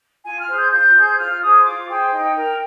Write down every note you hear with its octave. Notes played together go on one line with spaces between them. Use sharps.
F4 G#5
F6
G#4 C5
G6
F4 G6
G#4 C5
F4 F6
G#4 C5 D#6
F4 D6
G#4 C5 G5
D#4
A#4